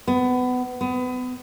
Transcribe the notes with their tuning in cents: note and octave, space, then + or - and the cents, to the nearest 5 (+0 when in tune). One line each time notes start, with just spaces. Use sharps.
B3 +20
B3 +30